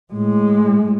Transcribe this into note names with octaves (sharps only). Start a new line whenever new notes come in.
A2 G#3